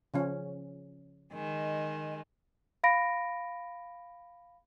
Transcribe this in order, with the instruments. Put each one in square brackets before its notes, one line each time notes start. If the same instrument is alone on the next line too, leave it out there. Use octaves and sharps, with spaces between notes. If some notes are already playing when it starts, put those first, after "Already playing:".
[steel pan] C#3 F3 C#4
[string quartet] D#3 G#3
[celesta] F5 B5 A#6 D7